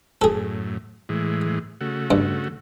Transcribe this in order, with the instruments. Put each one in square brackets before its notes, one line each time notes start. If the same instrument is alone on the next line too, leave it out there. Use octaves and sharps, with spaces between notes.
[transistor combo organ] F#2 A2 [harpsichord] G#4 A4
[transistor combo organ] A2 E3 G#3
C#3 A3 F#4
[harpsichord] G2